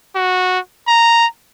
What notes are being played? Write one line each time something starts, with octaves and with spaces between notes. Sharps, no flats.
F#4
A#5